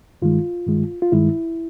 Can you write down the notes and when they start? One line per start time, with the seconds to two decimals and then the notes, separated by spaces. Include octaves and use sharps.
0.22 G2 D#3 G#3 F4
0.67 G2 D#3 G#3
1.02 F4
1.12 G2 D#3 G#3 E4